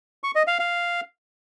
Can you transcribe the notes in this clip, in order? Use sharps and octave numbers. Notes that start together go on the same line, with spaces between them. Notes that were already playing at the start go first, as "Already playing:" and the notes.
C#6
D#5
F5
F5